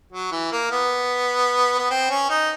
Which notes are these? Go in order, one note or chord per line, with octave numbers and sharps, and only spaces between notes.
F#3
E3
A#3
B3
B3
C4
C#4
D#4